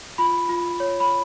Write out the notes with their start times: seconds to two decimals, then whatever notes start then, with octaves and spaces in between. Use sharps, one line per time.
0.18 F4 B5
0.49 F4
0.80 C#5
1.00 B5